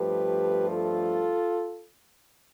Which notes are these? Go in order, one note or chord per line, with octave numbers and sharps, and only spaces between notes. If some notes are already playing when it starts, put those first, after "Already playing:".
Already playing: G2 F3 A3 G4 B4
F4 A4